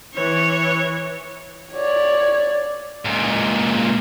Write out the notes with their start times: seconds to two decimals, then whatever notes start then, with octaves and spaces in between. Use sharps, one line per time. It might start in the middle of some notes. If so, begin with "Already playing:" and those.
0.15 E3 C#5
1.73 C#5 D5
3.05 C#2 A#2